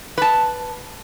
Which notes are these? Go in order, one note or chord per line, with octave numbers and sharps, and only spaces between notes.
B4 A5